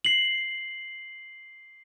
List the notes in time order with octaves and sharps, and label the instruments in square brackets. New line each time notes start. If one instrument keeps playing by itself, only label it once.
[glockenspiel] C7 F#7